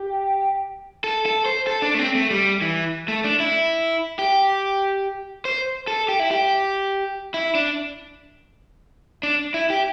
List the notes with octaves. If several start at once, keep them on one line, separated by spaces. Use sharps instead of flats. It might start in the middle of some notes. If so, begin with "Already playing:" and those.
Already playing: G4
A4
A4
C5
A4
D4
A3
C4
A3
G3
E3
A3
D4
E4
G4
C5
A4
G4
E4
G4
E4
D4
D4
E4
G4